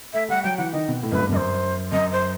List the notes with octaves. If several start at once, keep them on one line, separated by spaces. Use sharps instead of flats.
A3 E5
G3 F#5
F#3 G5
E3 F#5
D#3 D#5
B2
A2
F#2 B4
G2
E2
F#2 C5 D#5
F#2 D#5
C5